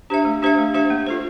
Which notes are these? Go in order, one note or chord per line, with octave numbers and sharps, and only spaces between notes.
D4 G4 C5 E5
A3
D4 G4 C5 E5
A3
D4 G4 C5 E5
A#3
F4 A4 C5